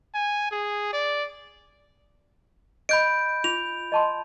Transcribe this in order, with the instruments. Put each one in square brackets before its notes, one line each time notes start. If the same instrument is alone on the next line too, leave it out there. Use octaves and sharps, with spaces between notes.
[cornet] G#5
G#4
D5
[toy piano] D#5 [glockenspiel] B5 G6 D7
[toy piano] F4 [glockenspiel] F7
[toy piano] D#5 A5 C6